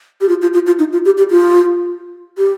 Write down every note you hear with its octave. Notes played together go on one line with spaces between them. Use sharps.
G4
F4
F4
F4
F4
D#4
F4
G4
G4
F4
G4